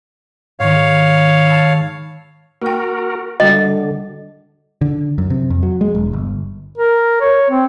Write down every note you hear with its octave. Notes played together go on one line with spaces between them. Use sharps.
G#2 D#3 C#5 F5
A5 B5 E6
A#3 F#4 A#4 G5
D3 G3 F#4 D#5 G5
D3
F#2
C3
F2
F#3
G#3
E1
G1
A#4
C#5
C4